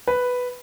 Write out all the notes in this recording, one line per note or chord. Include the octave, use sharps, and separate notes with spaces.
B4